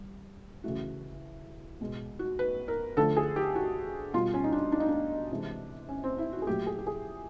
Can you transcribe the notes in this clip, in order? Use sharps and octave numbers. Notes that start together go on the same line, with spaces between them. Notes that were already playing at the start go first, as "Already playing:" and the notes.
Already playing: G3
C#3 E3 A3 F#4
B2 G#3
F#4
B4
A#4
D3 F3 A3 A4
G#4
G4
F#4
B2 G3 F4
C#4
D#4
D4
D4
D#4
D4
C3 E3 G#3
C#4
C4
E4
F#4
G#4
A#2 F#3 A3 G4
G#4
G4
G#4